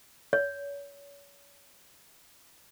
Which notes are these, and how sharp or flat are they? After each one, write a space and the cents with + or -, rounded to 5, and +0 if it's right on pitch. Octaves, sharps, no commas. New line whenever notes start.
C#5 +35